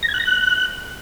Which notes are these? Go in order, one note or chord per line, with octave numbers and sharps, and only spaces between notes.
A#6
G#6
F#6
A#6
F#6